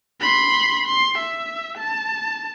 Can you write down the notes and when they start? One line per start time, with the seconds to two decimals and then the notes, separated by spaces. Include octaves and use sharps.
0.20 B5 C6
0.86 C6
1.18 E5
1.78 A5